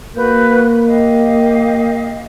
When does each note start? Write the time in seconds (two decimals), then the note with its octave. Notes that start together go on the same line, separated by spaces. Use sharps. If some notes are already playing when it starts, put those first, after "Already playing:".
0.16 A#3 F#4 B4 G6
0.86 G4 D#5 F5